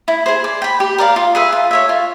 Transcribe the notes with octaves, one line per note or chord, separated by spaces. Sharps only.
E4
G#4 C5
D5
G5 B5
G4
A#4 D5 F5
F4
G#4 B4 E5
F4
A4 C#5 E5
F4